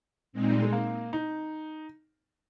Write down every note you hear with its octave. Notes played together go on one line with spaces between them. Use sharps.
A#2 G#3 C4 D#4
G3
G#3
A#3
D#4